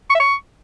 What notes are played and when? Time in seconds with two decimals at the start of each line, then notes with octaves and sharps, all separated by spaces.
0.10 C#6
0.15 E5
0.20 C#6